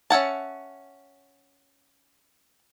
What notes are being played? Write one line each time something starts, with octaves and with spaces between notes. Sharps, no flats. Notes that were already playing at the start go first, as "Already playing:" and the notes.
C#4 E5 F#5 A5